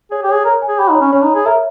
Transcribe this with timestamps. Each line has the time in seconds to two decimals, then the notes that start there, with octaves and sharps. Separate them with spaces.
0.11 G#4 C#5
0.23 G4
0.29 G#4 C#5
0.45 A#4 C#5
0.62 G#5
0.68 G#4
0.79 G4 B5
0.90 D#4
0.95 C#5
1.01 C#4
1.13 C#4 C#5
1.23 D#4
1.30 G#4 C#5
1.46 A#4 E5